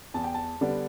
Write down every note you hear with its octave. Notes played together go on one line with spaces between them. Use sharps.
E2 A5
G5
A5
D3 G3 B3 D4